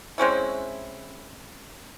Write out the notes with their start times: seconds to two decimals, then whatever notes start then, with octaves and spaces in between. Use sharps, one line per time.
0.18 G#3 C4 C#4 E4